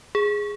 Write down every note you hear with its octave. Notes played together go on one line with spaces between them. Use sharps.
G#4